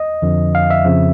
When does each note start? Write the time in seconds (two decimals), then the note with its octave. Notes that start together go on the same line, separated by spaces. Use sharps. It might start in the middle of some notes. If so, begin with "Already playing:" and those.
Already playing: D#5
0.22 F2 D3 F3
0.55 F5
0.71 E5
0.85 F2 C#3 F3